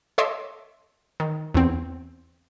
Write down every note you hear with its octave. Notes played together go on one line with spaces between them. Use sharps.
A4 C#5 D#5 E5 C6 D6
D#3
E2 C4